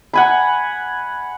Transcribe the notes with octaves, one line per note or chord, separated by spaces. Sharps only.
F#5 G#5 B5